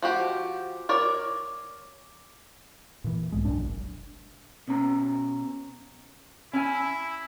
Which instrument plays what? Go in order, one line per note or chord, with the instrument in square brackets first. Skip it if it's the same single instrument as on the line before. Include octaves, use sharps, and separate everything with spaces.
[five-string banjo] F3 F#4 G4
A#4 C#5 D5
[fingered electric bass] A#2 E3
C2 G#2 G#3
F#1 B1 F#2 D4
[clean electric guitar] B2 C#4 A#5
[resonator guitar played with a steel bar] C#4 G#5 [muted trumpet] E4